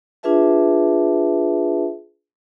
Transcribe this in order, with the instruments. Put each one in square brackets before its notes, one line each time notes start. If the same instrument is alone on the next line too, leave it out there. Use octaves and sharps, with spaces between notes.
[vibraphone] D4 F4 G#4 B4 E5 A5